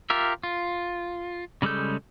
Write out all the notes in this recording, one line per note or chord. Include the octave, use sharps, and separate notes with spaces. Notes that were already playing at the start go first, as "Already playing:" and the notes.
F4 G4 A#4 E5
F4
C#3 G3 G#3 A4 G6